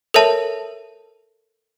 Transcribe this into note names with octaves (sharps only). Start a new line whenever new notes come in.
A4 A#4 C#5 E5 A5